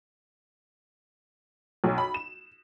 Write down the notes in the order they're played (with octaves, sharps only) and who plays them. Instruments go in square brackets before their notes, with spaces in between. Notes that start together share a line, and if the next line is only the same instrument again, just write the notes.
[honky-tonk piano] B1
B5
E7